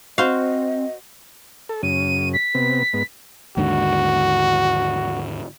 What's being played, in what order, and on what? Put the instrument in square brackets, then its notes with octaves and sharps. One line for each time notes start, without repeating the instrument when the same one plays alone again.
[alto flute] C4 [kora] F#4 [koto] C5 F5 [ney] D#5
[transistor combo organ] A4
[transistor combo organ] F#2 C#3 [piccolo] D#7
[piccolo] B6
[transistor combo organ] C3 B3
G#2 B3
[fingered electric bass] D#2 G#2 D3 [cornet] F#4